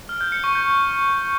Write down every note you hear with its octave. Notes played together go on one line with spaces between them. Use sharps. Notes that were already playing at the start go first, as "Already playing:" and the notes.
F6
G6
C#7
C#6
G6